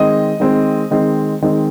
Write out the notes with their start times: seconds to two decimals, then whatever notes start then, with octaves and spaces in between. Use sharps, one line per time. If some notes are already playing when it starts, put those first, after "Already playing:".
Already playing: D#3 G#3 C4 D#5
0.40 D#3 G#3 C4
0.91 D#3 G#3 C4
1.42 D#3 G#3 C4